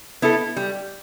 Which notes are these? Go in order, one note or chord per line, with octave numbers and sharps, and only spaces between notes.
B3 E4 A4
G3